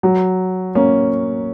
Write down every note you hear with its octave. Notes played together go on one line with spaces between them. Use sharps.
F#3
A#3 C#4